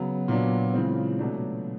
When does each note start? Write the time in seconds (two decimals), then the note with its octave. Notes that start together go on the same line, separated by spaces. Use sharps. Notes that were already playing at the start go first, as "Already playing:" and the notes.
Already playing: C#3 F#3 B3
0.28 A#2 F#3 B3 D4
0.74 C#3 E3 G#3 C4 F4
1.18 B2 F#3 A3 D4